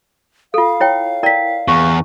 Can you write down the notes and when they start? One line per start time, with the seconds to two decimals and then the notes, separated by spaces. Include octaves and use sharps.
0.54 F4 A4 F5
0.80 E4 C#5 G5
1.23 E4 A#4 D5 G5 B6
1.68 E2 C#6